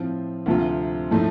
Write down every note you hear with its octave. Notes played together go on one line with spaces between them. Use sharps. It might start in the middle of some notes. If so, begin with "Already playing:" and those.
Already playing: A2 F3 C4 F4
D2 C3 F3 C4 F4
A2 F3 A3 D#4